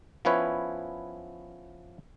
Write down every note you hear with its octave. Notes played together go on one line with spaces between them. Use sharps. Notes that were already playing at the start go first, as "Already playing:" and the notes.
F3 B3 C#4 E4 B4 C#5